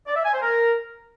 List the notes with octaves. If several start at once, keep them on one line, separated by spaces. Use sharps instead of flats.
D5
E5
G#5
C5
A#4